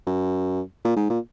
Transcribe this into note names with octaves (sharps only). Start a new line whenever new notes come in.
F#2
A#2
G#2
A#2